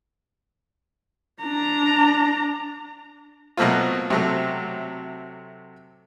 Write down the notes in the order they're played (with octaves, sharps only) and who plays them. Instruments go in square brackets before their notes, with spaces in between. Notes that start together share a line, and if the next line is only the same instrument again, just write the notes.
[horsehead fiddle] D4 A#5
[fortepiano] B2 F#3 A3 A#3 C4 F4
C3 F#3 A3